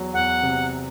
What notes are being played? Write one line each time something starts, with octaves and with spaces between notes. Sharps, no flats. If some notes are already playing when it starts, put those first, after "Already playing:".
Already playing: E2 F#3
E2 F#5
C3